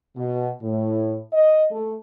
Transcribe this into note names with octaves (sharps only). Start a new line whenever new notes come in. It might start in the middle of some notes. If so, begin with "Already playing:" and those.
B2
A2
D#5
A3